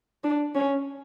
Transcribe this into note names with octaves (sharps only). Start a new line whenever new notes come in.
D4
C#4